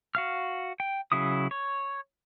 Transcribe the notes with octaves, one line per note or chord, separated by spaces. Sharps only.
F#4 F5 F6
G5
C#3 F#3 E4 D#6
C#5